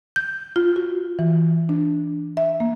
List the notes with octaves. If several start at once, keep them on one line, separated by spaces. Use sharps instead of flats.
G6
F4
F#4
E3
D4
E5
A#3